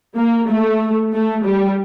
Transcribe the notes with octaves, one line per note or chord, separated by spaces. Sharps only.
A#3
A3
A3
G3